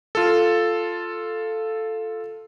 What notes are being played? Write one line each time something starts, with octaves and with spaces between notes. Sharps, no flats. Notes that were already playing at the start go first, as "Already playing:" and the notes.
F4 A4